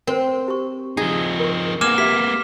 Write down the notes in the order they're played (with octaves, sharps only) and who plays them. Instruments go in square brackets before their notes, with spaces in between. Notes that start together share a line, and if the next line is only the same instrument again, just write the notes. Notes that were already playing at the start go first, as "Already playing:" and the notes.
[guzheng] C4 [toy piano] A#4 C5
[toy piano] G4 C#6
[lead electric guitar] F3 D#4 [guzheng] G#4
[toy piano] A#4 C#6
[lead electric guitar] A#3 B3 [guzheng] G#5 [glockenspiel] D6 F6 E7
[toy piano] G4 E5 [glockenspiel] B6